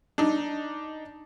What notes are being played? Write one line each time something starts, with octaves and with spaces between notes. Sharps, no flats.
D4 D#4